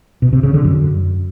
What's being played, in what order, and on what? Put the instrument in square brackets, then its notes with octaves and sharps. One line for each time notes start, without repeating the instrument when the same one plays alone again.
[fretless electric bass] B2
C3
C#3
D3
F#2